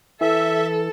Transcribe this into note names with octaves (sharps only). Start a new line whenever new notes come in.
E3 A4 E5